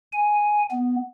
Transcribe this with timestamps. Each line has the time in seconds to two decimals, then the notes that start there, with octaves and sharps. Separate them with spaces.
0.12 G#5
0.71 B3